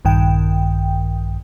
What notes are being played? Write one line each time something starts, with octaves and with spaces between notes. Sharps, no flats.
A#1 G2 D#3 G5